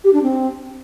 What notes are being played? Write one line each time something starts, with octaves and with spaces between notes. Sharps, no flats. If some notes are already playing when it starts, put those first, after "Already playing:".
G4
D4
C4